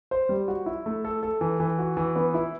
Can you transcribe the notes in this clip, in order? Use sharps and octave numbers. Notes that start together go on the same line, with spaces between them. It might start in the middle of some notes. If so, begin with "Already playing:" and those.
C5
G3
F#4
E4
A3
A4
A4
E3
E3
F#4
E3
B3
E4